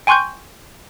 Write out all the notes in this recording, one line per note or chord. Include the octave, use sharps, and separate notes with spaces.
G5 G#5 C6 C#6 F#6 G6